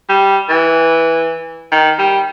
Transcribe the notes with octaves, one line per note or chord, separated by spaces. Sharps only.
G3
E3
D#3
G3